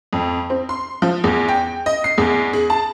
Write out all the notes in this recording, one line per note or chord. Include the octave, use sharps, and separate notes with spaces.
F2
C4
C6
F3
E2
G5
D#5
C7
E2
G#4
A5